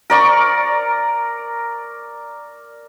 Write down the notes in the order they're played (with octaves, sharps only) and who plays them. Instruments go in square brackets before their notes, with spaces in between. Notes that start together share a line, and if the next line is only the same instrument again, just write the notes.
[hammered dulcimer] A#4 D5 C#6